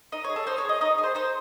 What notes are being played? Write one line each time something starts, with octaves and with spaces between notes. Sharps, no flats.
D#4 D#5
C#5
G#4
A4
D#4 C5
C#5
G#4 D#5
D#4 D#5
G#4
C5
D#4 C5